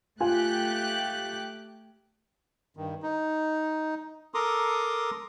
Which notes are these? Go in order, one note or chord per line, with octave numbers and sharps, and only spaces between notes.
A3 F4 G4 G#5 F#6
G2 D#3
D#4
A4 A#4 A#5 C6 D6 D#6